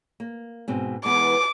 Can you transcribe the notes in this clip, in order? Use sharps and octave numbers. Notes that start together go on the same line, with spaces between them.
A#3
G#2 B2 C4
E3 G#3 B3 D6